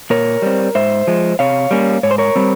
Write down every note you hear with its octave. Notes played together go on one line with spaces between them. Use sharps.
A#2 A#4 C#5
G3 C4
G#2 C5 E5
F3 G#3
C3 C#5 F5
G3 A#3 C#4
G#2 C#5
C5
A#4 C#5
G3 C4